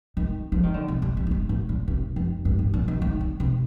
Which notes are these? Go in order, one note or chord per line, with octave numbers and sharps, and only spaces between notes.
D#3
F3
D#3
D3
C3
G2
F2
A2
G2
A2
A#2
C3
F2
G2
A2
A#2
D#3
D#3
D3
C3